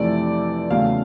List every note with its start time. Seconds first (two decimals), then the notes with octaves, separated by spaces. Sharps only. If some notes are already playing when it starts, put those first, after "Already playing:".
Already playing: F2 C3 E3 A3 D5
0.70 E2 C#3 F#3 A3 F5